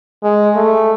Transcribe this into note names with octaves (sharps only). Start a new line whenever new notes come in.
G#3
A3